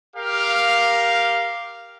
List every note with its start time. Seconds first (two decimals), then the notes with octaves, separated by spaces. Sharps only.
0.16 G4 A#4 F5